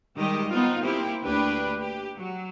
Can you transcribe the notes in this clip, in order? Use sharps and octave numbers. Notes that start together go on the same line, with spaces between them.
D#3 G3 G#3 G4 D#5
B3 C4 D#4 F4
A#3 C4 E4 G4
D2 A#3 D4 G4 B4
G4
F#3